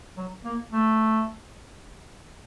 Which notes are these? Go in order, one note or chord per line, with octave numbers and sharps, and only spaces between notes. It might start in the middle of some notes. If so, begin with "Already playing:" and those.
F#3
A#3
A3